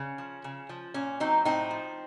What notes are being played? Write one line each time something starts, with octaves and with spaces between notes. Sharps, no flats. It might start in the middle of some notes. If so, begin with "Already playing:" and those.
Already playing: C#3 C#4
F3
C#3
F3
A#2 C#4
F#3 C4 D#4
A2 C4 D#4
F3